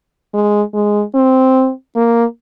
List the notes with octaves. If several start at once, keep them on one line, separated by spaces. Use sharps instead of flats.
G#3
G#3
C4
A#3